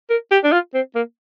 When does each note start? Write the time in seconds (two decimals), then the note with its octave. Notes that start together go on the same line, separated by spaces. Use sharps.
0.10 A#4
0.31 G4
0.44 D4
0.52 F4
0.74 C4
0.95 A#3